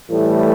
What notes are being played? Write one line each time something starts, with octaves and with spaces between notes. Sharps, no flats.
A2 E3 G3 A3